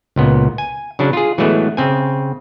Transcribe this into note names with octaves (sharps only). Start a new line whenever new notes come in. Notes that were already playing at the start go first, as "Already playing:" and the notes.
C#2 A#2 B3
G#5
C#3 F#3 D4
F4 G#4
E3 F#3 G#3 A3 B3
C#3 C4 G#5